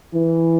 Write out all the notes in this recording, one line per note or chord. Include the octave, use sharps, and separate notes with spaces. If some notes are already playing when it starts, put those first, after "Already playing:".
E3